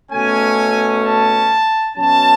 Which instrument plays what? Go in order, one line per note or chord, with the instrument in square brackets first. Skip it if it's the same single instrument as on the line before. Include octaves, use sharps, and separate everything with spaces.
[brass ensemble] B2 A3 C#4 G#5
A5
B2 F#3 C#4 A5